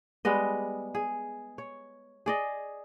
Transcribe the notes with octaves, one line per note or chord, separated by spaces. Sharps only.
G3 G#3 B3 D#5
G#4
C#5
G#4 D5 D#5